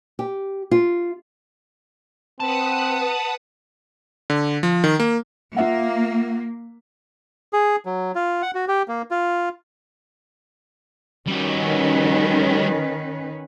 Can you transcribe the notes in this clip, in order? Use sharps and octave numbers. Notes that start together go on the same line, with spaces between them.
G4
F4
C4 B4 F#5 A5 D#6
D3
F3
D#3
A#3
A#3 F4 E5 F#5
G#4
F#3
F4
F#5
F#4
G4
A#3
F4
D#3 G3 C#4 F#4 B4